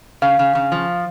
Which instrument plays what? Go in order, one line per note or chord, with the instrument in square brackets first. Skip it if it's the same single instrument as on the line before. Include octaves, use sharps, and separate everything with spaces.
[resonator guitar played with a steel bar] C#3 [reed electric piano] F5
[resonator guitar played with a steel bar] C#3
C#3
F3